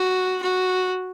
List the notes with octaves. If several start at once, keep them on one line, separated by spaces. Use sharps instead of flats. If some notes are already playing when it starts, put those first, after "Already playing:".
Already playing: F#4
F#4